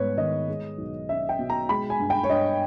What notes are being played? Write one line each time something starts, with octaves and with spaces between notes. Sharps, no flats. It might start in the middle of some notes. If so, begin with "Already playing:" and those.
Already playing: G#2 G3 B3 B4 C#5
D#3 D#5
G#3
B1
C#4 E5
G5
B2
A#5
G#3 B5
G#5
G2
G5
C#5
G2 D#5